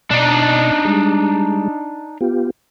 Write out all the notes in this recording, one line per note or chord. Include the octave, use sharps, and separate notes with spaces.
B2 D4 D#4
G3 G#3
B3 F4 G4